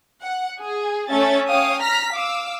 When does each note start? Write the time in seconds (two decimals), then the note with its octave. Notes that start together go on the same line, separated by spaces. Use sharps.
0.22 F#5
0.60 G#4
1.10 A3 C#4 E5 A6
1.49 C#4 C#5 F5 G5 D#6
1.82 A#5 F6 A#6 B6
2.13 F5 D6 E6